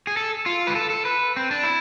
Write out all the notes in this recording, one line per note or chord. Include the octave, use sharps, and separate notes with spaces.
G#4
A4
F4
B4
A4
A4
B4
C4
D4
E4